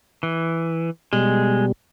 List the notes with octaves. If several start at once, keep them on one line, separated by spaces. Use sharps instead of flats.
E3
B2 G3 G#3